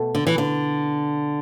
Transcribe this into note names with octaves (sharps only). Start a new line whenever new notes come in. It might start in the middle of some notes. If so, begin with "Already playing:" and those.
Already playing: B2 A3
D3
E3
D3